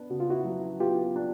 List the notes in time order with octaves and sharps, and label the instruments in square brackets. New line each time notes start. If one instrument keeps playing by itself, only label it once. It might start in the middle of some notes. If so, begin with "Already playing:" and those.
Already playing: [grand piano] B3 D4
[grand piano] C#3 [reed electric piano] F#4
[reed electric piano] F4
E4 F#4
[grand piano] F#3
[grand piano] B3 [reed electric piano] F4 G4
[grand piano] D4